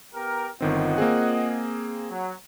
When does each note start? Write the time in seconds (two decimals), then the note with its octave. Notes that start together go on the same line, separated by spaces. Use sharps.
0.14 B3 G4 A#4
0.61 G1 D#3 C4 F4 D#5 F#5
0.98 A#3 C4 G#4
2.10 F#3